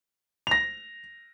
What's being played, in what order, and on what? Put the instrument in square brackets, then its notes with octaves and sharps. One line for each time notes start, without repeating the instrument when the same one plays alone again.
[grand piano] A#6 F7